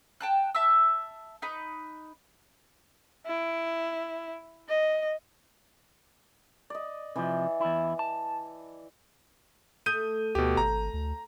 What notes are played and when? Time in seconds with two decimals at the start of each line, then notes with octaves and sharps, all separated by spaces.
0.21 G5 A5 F#6
0.55 E5 A5 E6
1.42 D#4 B4
3.26 E4
4.69 D#5
6.70 D5 D#5
7.16 C3 E3 F3
7.61 E2 E4
7.99 A5
9.86 A3 D#6 G6 D#7
10.35 D2 B2 A3 G4
10.57 G#1 A#5
10.93 D2